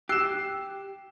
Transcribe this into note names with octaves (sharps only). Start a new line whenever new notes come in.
G4 E6 F#6 C7 E7